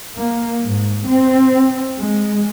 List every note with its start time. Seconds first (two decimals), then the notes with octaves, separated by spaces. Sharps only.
0.16 A#3
0.63 G#2
1.08 C4
1.99 G#3